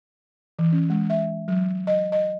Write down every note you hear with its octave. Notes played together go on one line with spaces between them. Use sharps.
E3
C#4
G#3
E5
F#3
D#5
D#5